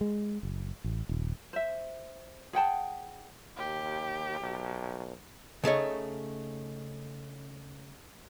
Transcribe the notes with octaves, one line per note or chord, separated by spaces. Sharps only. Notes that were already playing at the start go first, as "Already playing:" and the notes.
G#3
F#1
A1
D#1
C5 E5
G#4 F#5 G5 A5
D#2 G4
B1
C#3 A3 D#4 C#5